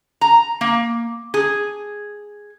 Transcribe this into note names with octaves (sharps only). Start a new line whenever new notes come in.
A#5
A#3
G#4